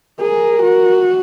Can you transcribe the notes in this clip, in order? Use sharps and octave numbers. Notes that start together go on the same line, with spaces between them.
G#4 A#4
F#4